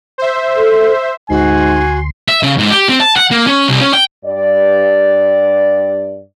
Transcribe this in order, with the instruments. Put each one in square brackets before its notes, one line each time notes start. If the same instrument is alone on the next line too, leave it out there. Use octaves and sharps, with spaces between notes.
[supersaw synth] C5 E5
[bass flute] A4
[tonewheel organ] D2 C6 [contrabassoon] G#2 [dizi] F#4 [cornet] G#5
[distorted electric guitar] E5
C#3
G#2
G4
C4
A5
F#5
A#3
C#4
C2
C#4
G5
[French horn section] G2 D5